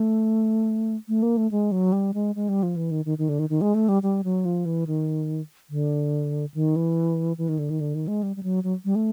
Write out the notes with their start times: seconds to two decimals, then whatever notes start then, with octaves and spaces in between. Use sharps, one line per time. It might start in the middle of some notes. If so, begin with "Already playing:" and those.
Already playing: A3
1.08 A3
1.23 A#3
1.37 A3
1.51 G#3
1.72 F#3
1.92 G3
2.14 G#3
2.35 G#3
2.49 G3
2.63 F3
2.76 E3
2.91 D#3
3.05 D#3
3.18 D#3
3.29 D3
3.39 D#3
3.50 D#3
3.61 G#3
3.75 A3
3.89 G3
4.03 G3
4.24 F#3
4.45 F3
4.65 E3
4.87 D#3
5.70 D3
6.54 D#3
6.76 E3
7.38 E3
7.49 D#3
7.59 D3
7.70 D#3
7.80 D3
7.95 D#3
8.08 G#3
8.23 G3
8.36 G3
8.43 F#3
8.64 F#3
8.85 G3
8.96 A3